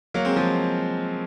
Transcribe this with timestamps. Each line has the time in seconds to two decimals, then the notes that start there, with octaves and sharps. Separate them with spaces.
0.14 F#3 A#3
0.25 G#3 C4
0.36 F3 G#3